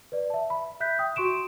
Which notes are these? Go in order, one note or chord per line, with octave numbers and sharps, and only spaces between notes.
B4 D5
E5 A5
B5
E5 F#6 G6 B6
G5 D#6
F#4 C6 C#6 D7 E7